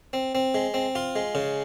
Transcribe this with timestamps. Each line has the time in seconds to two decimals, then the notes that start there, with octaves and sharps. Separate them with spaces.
0.13 C4
0.35 C4
0.54 G#3
0.74 C4
0.95 F4
1.16 G#3
1.35 C#3